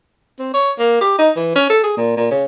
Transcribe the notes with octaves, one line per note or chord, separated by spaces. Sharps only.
C4
C#5
A#3
G4
D#4
E3
C#4
A4
G#4
A#2
A#2
C#3